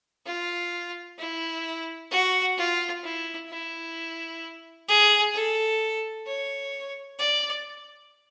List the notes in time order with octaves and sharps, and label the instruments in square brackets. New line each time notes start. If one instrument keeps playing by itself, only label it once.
[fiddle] F4
E4
F#4
F4
E4
E4
G#4
A4
C#5
D5